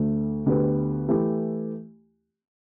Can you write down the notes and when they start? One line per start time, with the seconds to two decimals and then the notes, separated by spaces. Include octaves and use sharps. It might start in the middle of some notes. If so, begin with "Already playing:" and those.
Already playing: D2 D3 A3
0.46 D2 D3 B3 G4 B4
1.08 E3 A3 E4 G4